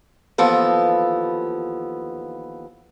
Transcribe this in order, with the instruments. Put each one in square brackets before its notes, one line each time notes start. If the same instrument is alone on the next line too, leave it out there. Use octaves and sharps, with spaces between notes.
[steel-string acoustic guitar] D#2 E3 F3 B3 A4